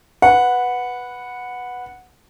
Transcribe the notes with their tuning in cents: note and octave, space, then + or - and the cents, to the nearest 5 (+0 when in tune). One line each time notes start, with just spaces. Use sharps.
B4 +0 F#5 -10